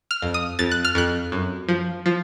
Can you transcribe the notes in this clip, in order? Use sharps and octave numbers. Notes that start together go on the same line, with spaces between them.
F6
F2
D#6
F2 A6
F#6
F6
F2 F#6
F#2
F3
F3